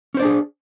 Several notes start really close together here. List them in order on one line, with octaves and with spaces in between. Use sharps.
C#4 C5 D5 D4 G#4